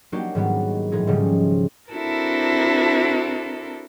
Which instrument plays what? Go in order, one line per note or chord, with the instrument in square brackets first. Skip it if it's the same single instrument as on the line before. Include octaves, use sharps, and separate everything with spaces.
[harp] F#3 A#3 D4 D#4 F#4 G4
G#2 D#3 F#3 G3 B3
A2 F3 D#4 G#4
G#2 C#3 F3 G3
[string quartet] C4 D4 E4 F#4 A4 A#4